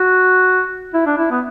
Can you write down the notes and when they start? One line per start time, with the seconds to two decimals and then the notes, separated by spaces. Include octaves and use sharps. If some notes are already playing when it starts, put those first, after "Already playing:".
Already playing: F#4
0.94 E4
1.06 D4
1.18 E4
1.31 B3